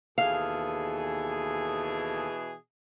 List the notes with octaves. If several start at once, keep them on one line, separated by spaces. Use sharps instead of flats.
D#2 B2 E3 G#4 A4 F5